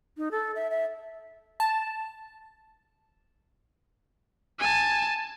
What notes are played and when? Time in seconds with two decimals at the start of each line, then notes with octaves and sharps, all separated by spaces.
0.17 D#4
0.31 A4
0.55 E5
0.70 E5
1.60 A5
4.59 G#5 A5